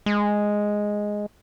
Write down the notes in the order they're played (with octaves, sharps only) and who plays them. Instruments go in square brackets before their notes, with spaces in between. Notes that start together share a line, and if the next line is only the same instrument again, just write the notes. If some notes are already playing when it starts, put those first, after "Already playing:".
[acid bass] G#3